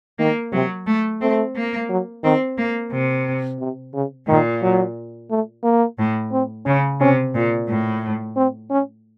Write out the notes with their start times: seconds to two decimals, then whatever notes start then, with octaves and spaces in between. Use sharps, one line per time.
0.19 D#3 A#3
0.52 C3 F#3
0.87 A3
1.21 A3 C4
1.55 A#3
1.89 F#3
2.23 D#3 C4
2.58 A#3
2.92 C3
3.60 C3
3.94 C#3
4.28 A#2 D#3
4.62 F#3
5.30 A3
5.63 A#3
5.98 A2
6.32 C4
6.66 C#3 C#4
7.00 C3 C#4
7.35 A#2
7.68 A2
8.36 C4
8.70 C#4